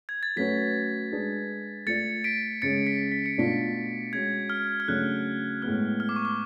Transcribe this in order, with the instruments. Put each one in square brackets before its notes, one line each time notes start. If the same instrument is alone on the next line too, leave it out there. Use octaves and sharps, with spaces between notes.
[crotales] G#6
A6
[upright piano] F#3 A3 C#4 F#4 B4 [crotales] B6
[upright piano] G#3 D4 G#4 B4
[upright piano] A3 F4 A4 D5 [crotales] A6 C#7
[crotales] B6 D7
[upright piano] C#3 G#3 C#4 [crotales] A6 C#7
[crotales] B6
B6
C#7
[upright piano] B2 A3 D4 F4 A4 [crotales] B6
[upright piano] G#3 C#4 F#4 [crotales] G#6
[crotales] F6
F6
[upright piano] C#3 F#3 A3 D4 [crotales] F#6
[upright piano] A2 G#3 B3 [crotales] F6
[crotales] F6
D6
C#6
D6